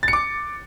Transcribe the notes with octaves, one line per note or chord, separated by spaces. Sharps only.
A6
C#7
D6